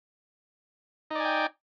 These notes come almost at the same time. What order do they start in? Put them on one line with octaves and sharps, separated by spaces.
D#4 D5 G#5 G5